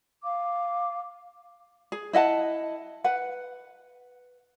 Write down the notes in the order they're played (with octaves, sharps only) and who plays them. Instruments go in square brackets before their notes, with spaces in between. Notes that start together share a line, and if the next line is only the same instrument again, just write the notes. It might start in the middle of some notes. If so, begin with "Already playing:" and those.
[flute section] F5 D6
[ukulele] G#4
E4 D#5 F#5 A5
B4 F#5